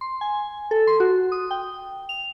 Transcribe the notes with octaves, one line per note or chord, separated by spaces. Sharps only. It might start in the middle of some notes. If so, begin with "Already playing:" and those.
C6
G#5
A4
C6
F#4
D#6
G5
F7